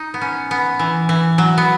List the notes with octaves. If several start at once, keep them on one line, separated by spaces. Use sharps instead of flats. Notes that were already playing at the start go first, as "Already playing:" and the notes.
Already playing: D#4
B3
C#4
B3
E3
E3
F#3
B3